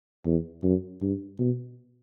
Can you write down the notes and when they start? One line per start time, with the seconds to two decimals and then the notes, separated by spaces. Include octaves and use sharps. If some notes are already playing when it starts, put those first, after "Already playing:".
0.25 E2
0.63 F#2
1.01 G2
1.39 B2